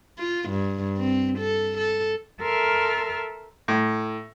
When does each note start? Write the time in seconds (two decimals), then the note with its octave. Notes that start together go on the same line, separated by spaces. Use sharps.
0.19 F4
0.49 G2
0.97 C4
1.39 A4
1.78 A4
2.42 A4 A#4 E5 C6 F6
3.68 A2